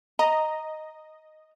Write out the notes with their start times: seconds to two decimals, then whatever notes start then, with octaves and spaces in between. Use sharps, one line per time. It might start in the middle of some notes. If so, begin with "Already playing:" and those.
0.19 D#5 A#5